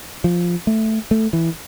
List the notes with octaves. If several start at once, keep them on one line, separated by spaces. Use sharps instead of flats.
F3
A3
A3
E3